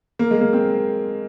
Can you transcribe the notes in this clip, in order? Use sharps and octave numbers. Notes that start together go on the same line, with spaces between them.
A#3
G#3
A#3
C4